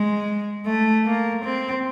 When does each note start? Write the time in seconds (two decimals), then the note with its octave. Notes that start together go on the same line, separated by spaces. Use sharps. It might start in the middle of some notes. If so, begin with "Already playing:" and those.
Already playing: G#3
0.66 A3
1.05 A#3
1.44 C4